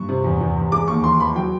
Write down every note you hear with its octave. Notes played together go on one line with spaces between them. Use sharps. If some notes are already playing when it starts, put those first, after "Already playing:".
Already playing: G2 C#6
C3
E2
E2
E2
G#3 D6
D#2 C#6
E3 C6
E3 B5
F#3 G5